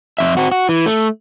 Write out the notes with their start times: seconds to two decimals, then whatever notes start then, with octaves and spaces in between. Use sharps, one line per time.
0.19 F2 E5
0.37 C4 F#4
0.52 F#4
0.69 E3
0.86 A3